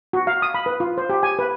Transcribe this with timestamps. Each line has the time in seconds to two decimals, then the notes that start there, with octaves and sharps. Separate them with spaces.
0.13 F#4
0.27 F5
0.42 D#6
0.54 B5
0.66 B4
0.80 F4
0.98 C5
1.10 G4
1.23 G#5
1.39 B4